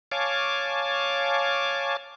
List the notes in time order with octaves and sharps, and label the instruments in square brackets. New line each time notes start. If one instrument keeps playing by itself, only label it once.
[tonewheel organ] C#5 F5 G#5 A5 D6